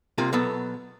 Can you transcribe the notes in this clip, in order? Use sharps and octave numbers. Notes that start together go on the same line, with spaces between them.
C2 C3 A#3 F4 A#5
B2 F#3 B3 A4